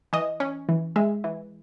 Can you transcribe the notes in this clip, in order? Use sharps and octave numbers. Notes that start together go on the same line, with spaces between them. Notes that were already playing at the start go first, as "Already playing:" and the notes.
E3 D#5
C#4
E3
G#3 E5
E3